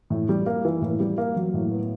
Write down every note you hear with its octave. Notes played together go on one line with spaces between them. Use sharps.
A2
G3
A#3
E3
A2
G3
A#3
F#3
A2
B3